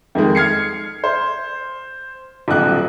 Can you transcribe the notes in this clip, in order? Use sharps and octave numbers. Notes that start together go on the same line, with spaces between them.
F2 D#3 G#3
F6 G#6 C7 C#7
C5
D#1 B1 F#6